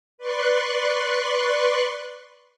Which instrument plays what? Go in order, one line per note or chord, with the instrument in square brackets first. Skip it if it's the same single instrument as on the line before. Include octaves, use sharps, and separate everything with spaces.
[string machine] B4 D5 C6 C#6 F#6